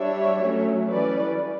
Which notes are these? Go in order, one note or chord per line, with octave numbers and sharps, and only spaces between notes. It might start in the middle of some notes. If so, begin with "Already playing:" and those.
Already playing: G3 D4 C#5 E5
F#3 A3 C#4
E3 G3 C#4 B4 D5